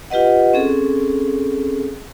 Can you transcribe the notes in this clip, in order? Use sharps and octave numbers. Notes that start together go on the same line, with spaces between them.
F4 G4 B4 D#5 F#5
C4 C#4 G#4 A4